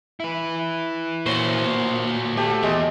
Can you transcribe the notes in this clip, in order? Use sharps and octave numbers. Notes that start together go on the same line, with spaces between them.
E4 B4
A#2 F#4 C5 C#5
A3 G4 A5
E2 G#3